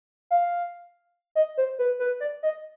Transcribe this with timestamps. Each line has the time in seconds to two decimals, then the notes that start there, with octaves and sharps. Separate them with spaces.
0.31 F5
1.35 D#5
1.57 C5
1.79 B4
1.99 B4
2.20 D5
2.43 D#5